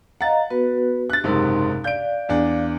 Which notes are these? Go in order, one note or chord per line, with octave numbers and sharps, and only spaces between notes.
D#5 F5 F#5 A#5 A6
B3 F#4 B4
F#6 A6
F#1 G#2 C3 D#4 A#4 C6
D5 F5 G6 D7
E2 D4